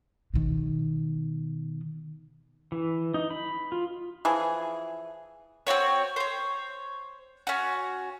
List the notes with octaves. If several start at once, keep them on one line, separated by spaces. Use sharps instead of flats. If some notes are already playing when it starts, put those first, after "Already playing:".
B2 D#3
E3
D#4
B5
F4
E3 F3 G#4
C4 E4 F#4 C#5
C5 C#5
C#4 F#4